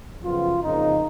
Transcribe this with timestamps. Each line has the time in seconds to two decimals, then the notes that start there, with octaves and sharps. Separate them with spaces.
0.23 F#2 C#3 F3 B3 F4
0.61 F2 C#3 F3 A#3 D#4